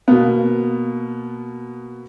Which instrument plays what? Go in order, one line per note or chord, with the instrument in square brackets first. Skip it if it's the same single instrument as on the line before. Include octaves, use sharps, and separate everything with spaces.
[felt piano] B2 A#3 B3